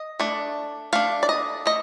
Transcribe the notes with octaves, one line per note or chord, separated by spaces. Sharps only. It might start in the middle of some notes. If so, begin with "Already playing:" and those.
Already playing: D#5
A3 D4
A3 D4 F5
D5
D#5
A3 D#5